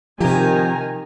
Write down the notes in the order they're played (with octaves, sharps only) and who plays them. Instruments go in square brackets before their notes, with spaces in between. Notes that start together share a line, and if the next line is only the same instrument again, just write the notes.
[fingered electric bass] C3 F3 [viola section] D#3 G#5 A#5 [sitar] G4